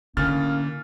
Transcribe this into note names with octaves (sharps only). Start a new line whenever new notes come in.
A2 D3 A#3 C#4 F6 A6